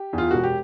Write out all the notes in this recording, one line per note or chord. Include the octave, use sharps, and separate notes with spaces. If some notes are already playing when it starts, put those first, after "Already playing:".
Already playing: G4
E2
F4
E1 F#4
G4